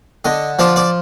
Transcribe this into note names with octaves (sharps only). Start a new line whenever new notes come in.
D3 D#5
F3 D5
D5